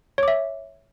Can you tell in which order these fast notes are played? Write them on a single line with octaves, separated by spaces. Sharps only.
C#5 D6 E5